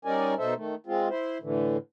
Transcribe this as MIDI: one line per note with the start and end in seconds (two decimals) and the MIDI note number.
0.05 0.34 55
0.05 0.34 61
0.05 0.34 63
0.05 0.34 70
0.05 0.34 74
0.05 0.34 80
0.38 0.54 47
0.38 0.54 63
0.38 0.54 69
0.38 0.54 72
0.38 0.54 76
0.56 0.75 51
0.56 0.75 57
0.87 1.09 56
0.87 1.09 60
0.87 1.09 65
1.09 1.38 64
1.09 1.38 72
1.42 1.77 45
1.42 1.77 50
1.42 1.77 52